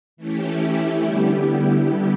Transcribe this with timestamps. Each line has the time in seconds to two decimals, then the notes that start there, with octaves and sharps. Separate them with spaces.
0.17 E3 A3 C#4 E4 G4
1.03 D3 G3 B3 E4 G4